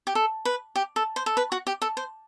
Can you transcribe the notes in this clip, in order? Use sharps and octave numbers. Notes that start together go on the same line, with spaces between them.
G4
A4
B4
G4
A4
C5
A4
B4
F#4
G4
A4
C5